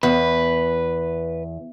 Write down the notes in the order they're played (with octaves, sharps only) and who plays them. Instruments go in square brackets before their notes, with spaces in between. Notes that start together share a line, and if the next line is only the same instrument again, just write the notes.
[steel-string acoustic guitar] E2 [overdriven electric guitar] B4